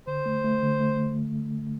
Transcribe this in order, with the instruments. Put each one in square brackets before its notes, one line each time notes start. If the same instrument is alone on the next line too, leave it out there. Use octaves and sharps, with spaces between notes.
[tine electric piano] D3 [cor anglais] C5
[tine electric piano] A3
A3
D3
A3